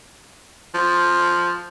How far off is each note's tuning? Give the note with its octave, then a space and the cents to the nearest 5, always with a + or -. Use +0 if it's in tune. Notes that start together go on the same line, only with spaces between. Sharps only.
F3 +0